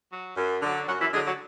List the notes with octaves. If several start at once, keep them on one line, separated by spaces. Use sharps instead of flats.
F#3
F#2
D3 F#3
F#2 F#3 F#4
E3 E4
D3 F#3 G#3 G#4
F#3 F#4